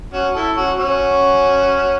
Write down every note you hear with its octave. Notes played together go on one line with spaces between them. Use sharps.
C#4 F#4
E4 A4
C#4 F#4
C#4 F#4